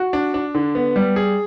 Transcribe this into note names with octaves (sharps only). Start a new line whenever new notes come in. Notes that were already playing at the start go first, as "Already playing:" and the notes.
Already playing: F#4
D4
D4
D3
B3
G3
G#4